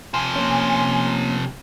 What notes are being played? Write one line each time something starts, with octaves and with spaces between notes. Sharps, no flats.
C3 F3 G#5 C6
A#3 C#4